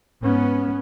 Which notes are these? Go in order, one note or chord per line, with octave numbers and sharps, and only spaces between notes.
G#2 B3 C#4